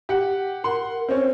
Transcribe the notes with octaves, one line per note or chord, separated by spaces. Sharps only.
G4 F#5
A#4 F#5 C6
C4 C#4 C5